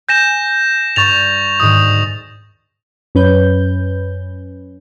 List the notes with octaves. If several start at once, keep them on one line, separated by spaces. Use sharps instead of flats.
G#5 G6 A#6 E7
G2 C#6 A6 F7
D2 G#2 D#3 D#6
F#2 C#4 B4 G6